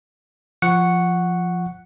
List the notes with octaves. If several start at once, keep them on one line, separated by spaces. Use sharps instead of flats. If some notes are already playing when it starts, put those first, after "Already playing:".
F3 F#5 C#6 C#7